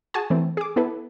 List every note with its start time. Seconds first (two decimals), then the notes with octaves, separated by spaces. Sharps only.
0.14 F#4 G#4 G#5 A5
0.30 E3 A3 C4
0.57 G#4 D6
0.76 B3 E4 A4 B4